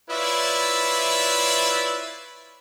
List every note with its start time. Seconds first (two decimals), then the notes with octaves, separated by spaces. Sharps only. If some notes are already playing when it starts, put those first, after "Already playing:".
0.11 E4 F4 B4 C#5 D5 E5